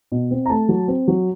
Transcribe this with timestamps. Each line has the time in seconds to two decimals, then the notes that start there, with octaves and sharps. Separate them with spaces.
0.12 B2
0.31 C4
0.46 A#5
0.50 A3 A5
0.69 F#3
0.88 C4
1.08 F#3